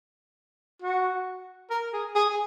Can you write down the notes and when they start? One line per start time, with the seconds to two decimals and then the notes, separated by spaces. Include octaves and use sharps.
0.82 F#4
1.70 A#4
1.93 G#4
2.15 G#4